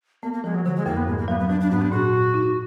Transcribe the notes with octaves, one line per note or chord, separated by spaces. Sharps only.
A#3 B3
A#3
F3 G#3
F#3
D3 F#3
G#3
F2 A#3
B3
G#2 G#3
A#3
F#3 B3
B3
F#3 D4
D4
G#2 B3
D4
A#2 F#4
A#2
D#4